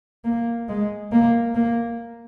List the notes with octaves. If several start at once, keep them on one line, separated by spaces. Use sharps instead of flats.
A#3
G#3
A#3
A#3